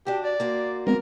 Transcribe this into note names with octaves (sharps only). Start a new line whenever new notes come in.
D4 F#4 G4
D5
A#3 F#4 C5
G#3 B3 C4 A#4